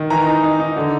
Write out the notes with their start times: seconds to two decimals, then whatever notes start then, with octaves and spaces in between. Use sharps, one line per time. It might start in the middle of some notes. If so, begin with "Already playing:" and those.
Already playing: D#3
0.10 E3 A#5
0.26 D#4
0.43 D#4
0.60 D#4
0.76 D3